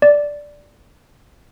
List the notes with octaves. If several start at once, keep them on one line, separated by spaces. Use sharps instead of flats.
D5